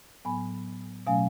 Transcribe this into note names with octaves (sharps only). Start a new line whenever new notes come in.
A2 F#3 B3 G#5 B5
B2 F#3 A3 C#4 F5 G#5